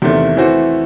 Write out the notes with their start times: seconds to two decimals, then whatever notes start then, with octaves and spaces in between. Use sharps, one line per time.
0.02 E2 C3 D#3 A3
0.37 E3 A3 C4 F#4 C5